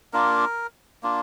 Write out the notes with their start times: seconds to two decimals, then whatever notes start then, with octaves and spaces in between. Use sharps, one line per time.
0.13 A#3 D4 F4 A#4
1.03 A#3 D4 F4